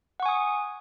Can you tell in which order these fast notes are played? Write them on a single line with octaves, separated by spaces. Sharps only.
F#5 C#6 G#5 D#6